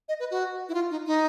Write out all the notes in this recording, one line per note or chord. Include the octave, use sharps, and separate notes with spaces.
D#5
B4
F#4
E4
F4
D#4
D#4